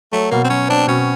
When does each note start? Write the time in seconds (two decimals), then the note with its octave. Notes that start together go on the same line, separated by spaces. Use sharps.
0.12 F#3 A3
0.31 B2 A#3
0.44 C4
0.50 F#3 C#4
0.69 C4 D4
0.87 B2 C#4